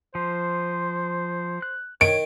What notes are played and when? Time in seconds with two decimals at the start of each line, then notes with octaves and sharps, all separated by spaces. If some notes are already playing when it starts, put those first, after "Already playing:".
0.15 F3 C5
1.62 F#6
2.01 D#3 C#5 D7